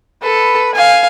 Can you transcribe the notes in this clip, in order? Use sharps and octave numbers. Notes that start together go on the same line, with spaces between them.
A4 B4
F5 G#5